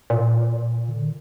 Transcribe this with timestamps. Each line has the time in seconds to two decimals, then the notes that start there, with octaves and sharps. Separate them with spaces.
0.10 A#2
0.88 D3
1.01 D#3